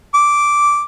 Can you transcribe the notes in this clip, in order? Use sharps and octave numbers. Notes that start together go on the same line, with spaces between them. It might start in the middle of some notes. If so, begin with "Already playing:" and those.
D6